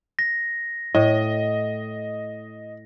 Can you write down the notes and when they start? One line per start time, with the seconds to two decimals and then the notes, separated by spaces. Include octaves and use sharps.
0.19 A#6
0.95 A2 D#5